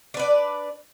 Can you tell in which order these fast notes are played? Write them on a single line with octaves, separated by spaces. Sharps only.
D4 B4 D5